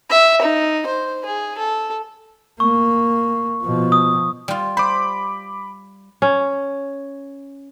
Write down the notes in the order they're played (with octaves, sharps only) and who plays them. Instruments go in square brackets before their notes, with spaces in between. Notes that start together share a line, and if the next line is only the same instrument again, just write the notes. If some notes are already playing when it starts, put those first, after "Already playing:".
[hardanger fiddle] E5
D#4
C5
G#4
A4
[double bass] A#3 [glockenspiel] C#6
[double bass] B2 F3
[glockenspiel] D#6
[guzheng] G3 F4
[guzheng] C5 [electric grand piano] B5 D6
[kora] C#4